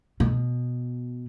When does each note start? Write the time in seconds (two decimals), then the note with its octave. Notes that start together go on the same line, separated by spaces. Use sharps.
0.20 B2